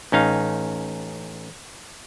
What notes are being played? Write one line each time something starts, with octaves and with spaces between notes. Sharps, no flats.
A1 C#4 D#4 F5